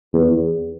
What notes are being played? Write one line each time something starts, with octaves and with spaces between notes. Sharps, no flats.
E2